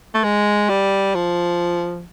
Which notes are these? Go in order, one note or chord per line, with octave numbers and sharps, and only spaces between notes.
A3
G#3
G3
F3